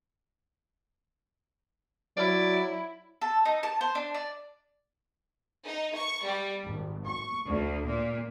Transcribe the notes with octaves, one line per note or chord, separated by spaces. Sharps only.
F#3 E4 D5
A4
D#4
A5
C5
D4
D5
D#4
C#6
G3
G#1
C#6
D2
A#2